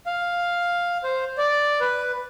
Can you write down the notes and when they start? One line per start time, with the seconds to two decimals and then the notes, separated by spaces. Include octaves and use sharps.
0.06 F5
1.04 C5
1.38 D5
1.80 B4